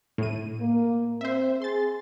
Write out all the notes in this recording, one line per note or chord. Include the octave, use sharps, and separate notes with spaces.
A2 D#7
A#3
C4 C5 E5
G#4 C6 A6